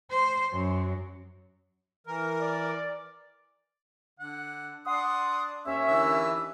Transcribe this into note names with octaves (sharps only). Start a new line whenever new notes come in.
C5
F#2
E3 A#4
D5
D3 F#5
D4 F#5 C6 D#6
D#2 C#4 E5
D3 E3 E6